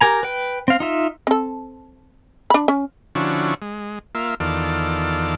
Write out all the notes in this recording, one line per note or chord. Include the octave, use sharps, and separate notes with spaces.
G4 A#4 G#5 A#5
B4 G5
C4 F5
D#4 F4 E5
C4 A4
D4 B5
C#4
D3 F3 C#4 D4 E4 F#4
G#3
A#3 F4 E5
E2 D#3 F4 A4 D5